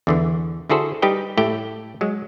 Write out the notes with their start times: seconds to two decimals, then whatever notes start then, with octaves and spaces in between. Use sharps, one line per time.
0.07 E2 D3 E3
0.70 D3 E4 F#4 G#4 A4 C5
1.02 G3 D#4 G4 B4 D#5 G5
1.38 A2 A3 G4 G5
2.01 F#3 G#3